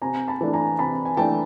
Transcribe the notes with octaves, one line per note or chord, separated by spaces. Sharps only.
C3 G#5 A#5
A5 B5
E3 A3 D4
G#5 A#5
C3 A5 B5
G#5
E3 A3 D4 G5 A5